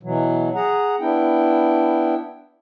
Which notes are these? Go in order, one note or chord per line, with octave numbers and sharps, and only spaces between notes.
B2 E3 F#3
G#4 F#5 A#5
B3 D4 E4 G5